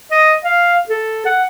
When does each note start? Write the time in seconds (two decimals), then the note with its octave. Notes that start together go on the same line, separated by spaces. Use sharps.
0.11 D#5
0.44 F5
0.89 A4
1.26 F#5